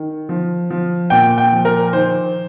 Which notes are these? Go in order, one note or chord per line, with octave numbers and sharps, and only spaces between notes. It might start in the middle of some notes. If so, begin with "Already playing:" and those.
Already playing: D#3
F3
F3
A#2 G5
G5
F3
A#4
D#3 C5